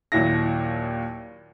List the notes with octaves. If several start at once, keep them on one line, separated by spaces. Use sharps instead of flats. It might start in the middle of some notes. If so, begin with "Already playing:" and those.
D#2 A#2 F#3 E4 A#6